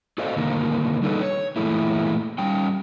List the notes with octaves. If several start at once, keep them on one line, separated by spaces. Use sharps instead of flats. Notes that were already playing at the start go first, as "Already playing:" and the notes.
F#4 A4 C5 D5 D#5 F5
B2 D3 D#3 A#3 A#4
G3 D4 D#4 G#4 A4 B4
C#5
A#2 E3 G#3 A3 E4
G3 C#4 G5